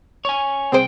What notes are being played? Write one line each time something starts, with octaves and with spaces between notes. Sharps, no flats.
C#5 G#5
C2 C4 G#4 C5 G5